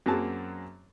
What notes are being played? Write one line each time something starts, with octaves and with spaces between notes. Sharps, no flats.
F#2 F#3 A#3 C4 G#4 A5